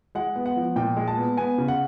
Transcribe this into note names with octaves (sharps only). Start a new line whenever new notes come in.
G#3 F#5
B3
F#5
F3
A#2 G5
G#3
A5
B3
B3 G#5
C#3
F#5